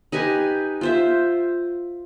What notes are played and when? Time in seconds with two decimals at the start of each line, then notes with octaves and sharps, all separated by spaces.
0.12 D#4 G4 B4 G#5
0.81 F4 C5 E5